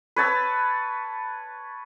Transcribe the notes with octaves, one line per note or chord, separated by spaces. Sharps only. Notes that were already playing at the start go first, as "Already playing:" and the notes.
B4 C#5 A5 E6